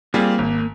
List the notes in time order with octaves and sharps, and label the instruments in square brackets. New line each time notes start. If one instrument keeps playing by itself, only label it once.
[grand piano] G3 C4 F4 G#4 [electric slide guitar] A#3
[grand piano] G#1